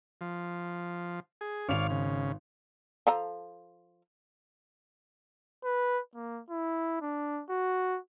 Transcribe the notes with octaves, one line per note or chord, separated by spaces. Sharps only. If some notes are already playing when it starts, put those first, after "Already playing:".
F3
G#4
G#1 C#5 D5 F5 F7
C#3
F3 A4 A#5
B4
A#3
E4
D4
F#4